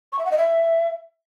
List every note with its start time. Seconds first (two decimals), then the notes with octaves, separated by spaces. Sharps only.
0.12 C#6
0.19 E5
0.25 F#5
0.31 D#5
0.38 E5